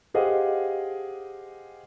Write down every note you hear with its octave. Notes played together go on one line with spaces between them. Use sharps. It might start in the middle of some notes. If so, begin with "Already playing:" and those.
G4 G#4 C5 D#5 F5 F#5